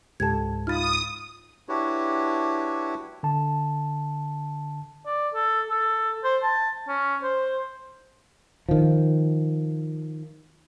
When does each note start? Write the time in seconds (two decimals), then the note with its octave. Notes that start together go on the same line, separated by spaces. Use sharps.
0.20 C#2 G#2 G4 A4 A5 G#6
0.67 D#4 F4 B5 D#6 F6 A6
1.69 D4 E4 F#4 G4 B4 C#5
3.23 D3 A5
5.06 D5
5.34 A4
5.70 A4
6.24 C5
6.43 A5
6.88 C#4
7.23 C5
8.69 D#3 F3